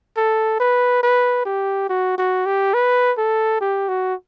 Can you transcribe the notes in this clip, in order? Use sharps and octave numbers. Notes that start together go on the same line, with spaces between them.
A4
B4
B4
G4
F#4
F#4
G4
B4
A4
G4
F#4